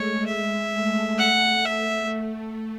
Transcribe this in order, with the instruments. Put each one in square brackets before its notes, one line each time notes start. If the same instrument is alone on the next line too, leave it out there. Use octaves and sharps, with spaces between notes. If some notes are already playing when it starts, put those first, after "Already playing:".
Already playing: [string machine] G#3 A3 [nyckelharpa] C#5
[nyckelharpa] E5
[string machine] A3
[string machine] A3 [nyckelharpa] F#5
[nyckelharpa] E5